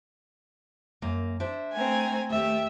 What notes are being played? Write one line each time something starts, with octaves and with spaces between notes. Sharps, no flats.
F#2 A#3
D4 C5 E5
A3 C4 G#5 A#5
D#2 A3 G4 E5